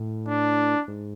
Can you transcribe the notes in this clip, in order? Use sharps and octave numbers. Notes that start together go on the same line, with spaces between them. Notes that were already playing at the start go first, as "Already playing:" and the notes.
Already playing: A2
D4
G#2